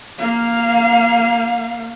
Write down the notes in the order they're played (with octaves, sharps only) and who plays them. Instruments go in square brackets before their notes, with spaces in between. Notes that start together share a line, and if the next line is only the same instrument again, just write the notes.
[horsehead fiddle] A#3 F5